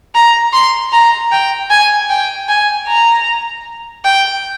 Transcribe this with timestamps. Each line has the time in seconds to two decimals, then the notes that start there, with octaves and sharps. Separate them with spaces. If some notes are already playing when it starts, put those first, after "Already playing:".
0.15 A#5
0.53 C6
0.92 A#5
1.32 G5
1.70 G#5
2.09 G5
2.48 G#5
2.87 A#5
4.05 G5